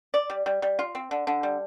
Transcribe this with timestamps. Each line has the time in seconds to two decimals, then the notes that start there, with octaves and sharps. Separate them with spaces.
0.14 D5
0.30 G3
0.46 G3
0.62 G3
0.79 F4
0.95 C4
1.11 D3
1.27 D3
1.43 G3